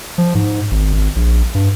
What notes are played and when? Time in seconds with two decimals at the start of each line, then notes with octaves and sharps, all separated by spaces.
0.18 F3
0.35 G#2
0.71 G#1
0.93 G#1
1.16 A#1
1.55 G2